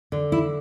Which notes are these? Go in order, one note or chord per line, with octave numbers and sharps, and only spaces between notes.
D3
E4